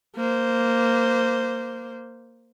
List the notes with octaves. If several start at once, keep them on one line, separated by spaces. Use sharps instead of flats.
A#3 C5